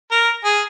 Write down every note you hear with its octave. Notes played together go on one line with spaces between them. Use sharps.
A#4
G#4